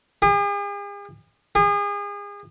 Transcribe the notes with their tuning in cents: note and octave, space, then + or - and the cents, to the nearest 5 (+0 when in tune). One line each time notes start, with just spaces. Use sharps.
G#4 -45
G#4 -35